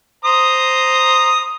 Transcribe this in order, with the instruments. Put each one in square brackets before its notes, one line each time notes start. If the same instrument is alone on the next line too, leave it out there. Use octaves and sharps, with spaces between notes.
[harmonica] C5 A#5 D#6